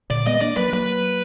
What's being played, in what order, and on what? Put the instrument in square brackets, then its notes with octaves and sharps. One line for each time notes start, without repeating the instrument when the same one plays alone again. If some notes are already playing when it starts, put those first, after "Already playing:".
[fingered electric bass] A#2 D3 [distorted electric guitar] D5
[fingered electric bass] G#3 B3 [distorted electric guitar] D#5
[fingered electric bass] A#3 D4 [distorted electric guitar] D5
[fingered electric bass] F#3 A#3 [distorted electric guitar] B4
[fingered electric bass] F#3 A#3 [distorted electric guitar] B4